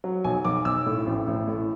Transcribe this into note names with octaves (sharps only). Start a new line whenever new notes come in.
F#3
B1 G#5
B1 D6
B1 E6
A2
A1
A1
A2